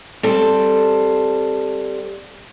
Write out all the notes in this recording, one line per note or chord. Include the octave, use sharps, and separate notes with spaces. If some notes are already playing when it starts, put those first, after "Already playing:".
G3 C4 A4